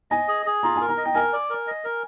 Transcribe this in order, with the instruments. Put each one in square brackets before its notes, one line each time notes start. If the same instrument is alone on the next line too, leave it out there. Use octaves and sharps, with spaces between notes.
[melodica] D#5 [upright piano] G#5
[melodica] G#4
G#4
[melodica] F4 [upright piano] A#5
[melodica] A#4 [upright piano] G#5
[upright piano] A#5
[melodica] D#5
[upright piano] G5
[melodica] A#4 [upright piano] G#5
[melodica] D5
A#4
D#5
A#4